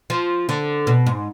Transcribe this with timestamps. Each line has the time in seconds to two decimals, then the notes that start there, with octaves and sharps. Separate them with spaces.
0.10 F3
0.49 D3
0.87 B2
1.06 G#2